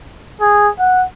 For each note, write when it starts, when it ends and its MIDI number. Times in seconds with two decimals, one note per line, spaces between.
0.40 0.68 68
0.79 1.04 78